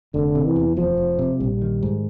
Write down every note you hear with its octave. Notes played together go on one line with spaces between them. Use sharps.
F1 D3
C3
E3
E2
F1 F3
F1
C3
A#1 G3
D#3
G#2